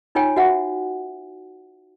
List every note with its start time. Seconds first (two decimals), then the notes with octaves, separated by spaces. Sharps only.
0.15 D#4 F4 C#5 G5 G#5
0.36 F#4 E5 F#5